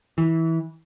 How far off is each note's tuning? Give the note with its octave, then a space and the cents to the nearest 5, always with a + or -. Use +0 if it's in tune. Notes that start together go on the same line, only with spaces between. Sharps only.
E3 -20